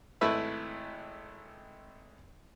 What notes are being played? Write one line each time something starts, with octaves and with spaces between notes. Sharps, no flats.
G#1 A3 E4 B4 E5 B5